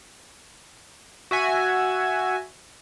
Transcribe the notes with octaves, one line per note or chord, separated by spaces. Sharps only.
F#4 E5 G#5